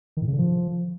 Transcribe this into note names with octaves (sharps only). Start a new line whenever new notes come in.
D#3
A2
C#3
D3
F3